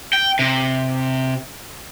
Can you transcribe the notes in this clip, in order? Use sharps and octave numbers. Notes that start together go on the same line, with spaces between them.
G5
C3